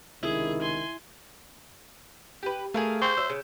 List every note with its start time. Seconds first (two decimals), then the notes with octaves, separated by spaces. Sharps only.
0.23 C#2 C3 D#3 E4 G#4
0.62 G#5 C6
2.43 G4 B4
2.74 A3 G#4 A#4 F5
3.02 C5 C#6 G6
3.17 F#3 E5 E6
3.30 C#3